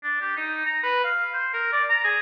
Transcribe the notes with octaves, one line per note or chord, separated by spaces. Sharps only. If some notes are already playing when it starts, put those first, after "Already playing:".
D4
G4
D#4
A#5
B4
F5
C5
A#4
D5
A#5
G#4